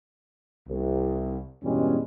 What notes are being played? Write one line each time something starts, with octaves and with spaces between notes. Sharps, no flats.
C2
E2 G2 B2 G3 G#3 C#4